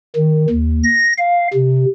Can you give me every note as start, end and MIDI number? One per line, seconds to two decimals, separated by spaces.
0.16 0.46 51
0.49 0.82 39
0.83 1.13 94
1.18 1.48 77
1.54 1.85 48